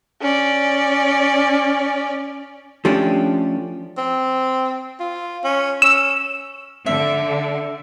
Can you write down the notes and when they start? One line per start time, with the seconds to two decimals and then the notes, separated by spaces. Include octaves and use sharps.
0.21 C#4 D5
2.85 F3 A3 C#4 D4 G4
3.98 C4
5.00 F4
5.44 C#4
5.82 C#4 E6
6.86 D3 E5